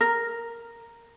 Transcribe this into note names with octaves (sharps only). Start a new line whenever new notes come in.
A#4